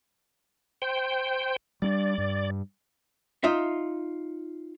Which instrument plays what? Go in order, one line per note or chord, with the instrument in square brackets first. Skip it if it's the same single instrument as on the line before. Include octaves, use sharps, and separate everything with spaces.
[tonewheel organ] C5 G5
[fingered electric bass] G3 C4 D4 [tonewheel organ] D5
[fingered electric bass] G2
[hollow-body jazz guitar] D#4 F4 E5